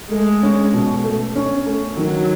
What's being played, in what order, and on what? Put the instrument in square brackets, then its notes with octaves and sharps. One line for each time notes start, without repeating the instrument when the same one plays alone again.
[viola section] G#3 [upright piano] A3
[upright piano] C#4
B2
A3
C#4
A3
[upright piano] D#3 [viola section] F#3